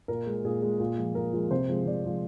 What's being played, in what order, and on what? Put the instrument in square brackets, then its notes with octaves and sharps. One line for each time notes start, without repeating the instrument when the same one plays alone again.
[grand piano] A#2 A#4
G#3
A#2 G#4
G#3
A#2
F3 G#3
A#2 A#4
F3 G#3
C3 C5
F3 G#3
C3 D5
F3 G#3